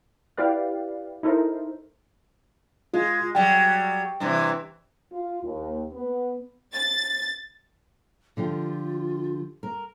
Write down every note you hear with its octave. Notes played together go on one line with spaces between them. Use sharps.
E4 G4 B4 D5 F5
D#4 E4 A4 A#4 C5
G#3 F4
F#3 G3 G5
G2 C3 E3
F4
D#2
B3
A6
D3 F3 F4 G4
A#4